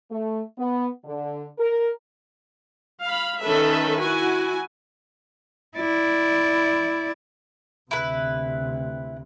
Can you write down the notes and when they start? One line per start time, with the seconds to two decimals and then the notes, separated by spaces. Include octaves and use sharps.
0.10 A3
0.58 B3
1.05 D3
1.58 A#4
3.02 F5 B5
3.42 D#3 C#4 A4 B4 E5
4.00 E4 F#4 G#5
5.77 E4 D5
7.91 D2 C3 E4 B4